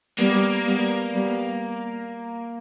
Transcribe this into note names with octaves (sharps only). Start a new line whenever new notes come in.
G3 A#3 B3
G3 B3
G3 B3